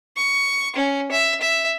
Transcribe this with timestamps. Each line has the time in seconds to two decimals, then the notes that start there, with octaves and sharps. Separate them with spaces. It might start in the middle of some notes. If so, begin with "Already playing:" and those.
0.17 C#6
0.76 C#4
1.12 E5
1.41 E5